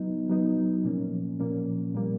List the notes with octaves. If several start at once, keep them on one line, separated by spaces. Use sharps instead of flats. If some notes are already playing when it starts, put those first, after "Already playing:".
Already playing: F#3 B3 D#4
F#3 B3 D#4
A#2 F3 A#3 C#4
A#2 F3 A#3 C#4
A#2 G3 A#3